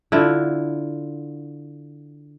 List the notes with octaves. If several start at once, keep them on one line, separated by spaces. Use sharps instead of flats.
D3 E4 F4